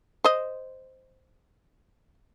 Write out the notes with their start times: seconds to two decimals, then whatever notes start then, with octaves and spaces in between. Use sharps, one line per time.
0.24 C5 D#5